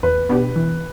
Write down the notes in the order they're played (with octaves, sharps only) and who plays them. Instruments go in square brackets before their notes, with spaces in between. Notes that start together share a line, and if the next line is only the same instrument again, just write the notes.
[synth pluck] E2 [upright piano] B4
[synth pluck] B2 B3 D4 G4
E3